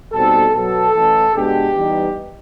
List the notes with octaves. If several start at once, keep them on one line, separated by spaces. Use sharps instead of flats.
B2 G3 C4 D#4 A4
B2 F#3 B3 A4
E3 A3 C#4
B2 G#3 B3 D4 G4
E3 G3 B3 D#4